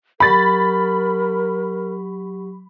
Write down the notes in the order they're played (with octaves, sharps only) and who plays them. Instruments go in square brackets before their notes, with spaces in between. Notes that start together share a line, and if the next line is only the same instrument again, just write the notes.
[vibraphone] F#3 G4 C#6 [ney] A#4 [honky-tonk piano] B5 A6